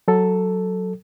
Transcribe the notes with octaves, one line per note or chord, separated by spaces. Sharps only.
F#3 A4